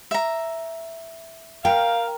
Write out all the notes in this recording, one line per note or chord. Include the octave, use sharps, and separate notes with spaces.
E5 A#5
A#4 F5 G5